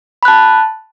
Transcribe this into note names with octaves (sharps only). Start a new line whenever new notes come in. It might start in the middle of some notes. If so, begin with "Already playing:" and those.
A5 B5 F#6